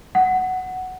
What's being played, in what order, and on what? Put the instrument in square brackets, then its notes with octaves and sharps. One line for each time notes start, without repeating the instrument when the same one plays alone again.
[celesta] F#5